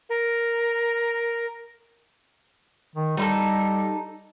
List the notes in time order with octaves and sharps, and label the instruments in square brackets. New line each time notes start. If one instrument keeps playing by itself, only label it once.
[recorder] A#4
[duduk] D#3
[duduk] G3 [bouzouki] D#4 E4 A4